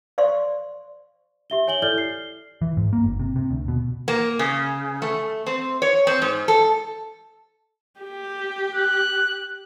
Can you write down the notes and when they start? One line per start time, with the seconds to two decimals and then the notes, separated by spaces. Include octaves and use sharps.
0.18 C5 D5 F5 C6 C#6
1.50 G4 E5 G7
1.68 C#5 G#5 F#7 G7
1.82 E4 A4 D5 F6 G6 G7
1.98 C7
2.62 E3
2.77 G#2
2.93 A#3
3.04 G1
3.20 C3
3.36 C3
3.51 D2
3.68 B2
4.08 A#3
4.39 C#3
5.02 A3
5.46 C4
5.82 C#5
6.07 C4
6.22 G#2
6.48 A4
8.00 G4
8.75 F#6